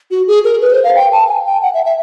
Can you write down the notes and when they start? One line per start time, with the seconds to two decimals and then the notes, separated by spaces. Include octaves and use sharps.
0.11 F#4
0.28 G#4
0.44 A#4
0.61 B4
0.72 C5
0.84 F5
0.96 G5
1.12 A5
1.29 G#5
1.46 G5
1.62 F#5
1.74 E5
1.85 E5